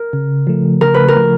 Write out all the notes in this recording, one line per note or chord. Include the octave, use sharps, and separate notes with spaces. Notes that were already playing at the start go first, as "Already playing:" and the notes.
Already playing: A#4
C#3
F3 A3
C#3 A#4
B4
A#4
F3 A3